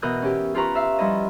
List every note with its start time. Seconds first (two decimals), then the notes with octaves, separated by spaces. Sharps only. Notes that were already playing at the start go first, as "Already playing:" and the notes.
0.02 B2 E3 A#4 D#6 F#6 G6
0.22 C#4 G4
0.55 F4 G4 B4 A#5 C#6
0.75 E5 F5
0.98 F3 G3 E4 D#5